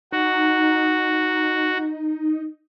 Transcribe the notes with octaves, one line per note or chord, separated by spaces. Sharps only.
D#4 F#4